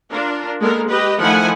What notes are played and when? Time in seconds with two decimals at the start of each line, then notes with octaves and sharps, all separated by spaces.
0.12 D4 F4 A#4
0.61 G#3 A#3 B3 A4 A#4
0.90 G4 B4 D#5
1.22 D#3 F3 A3 E4 F#5 G#5